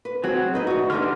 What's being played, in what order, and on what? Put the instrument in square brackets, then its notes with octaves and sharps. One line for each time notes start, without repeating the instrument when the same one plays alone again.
[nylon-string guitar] B4
[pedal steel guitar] F#3 F#4 G#4 [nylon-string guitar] C4
[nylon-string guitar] B2 B4 D#5 [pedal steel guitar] D#4
[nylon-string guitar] D2 F#4
[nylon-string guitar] D3 E3 D#4 [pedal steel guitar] G4 C6 F6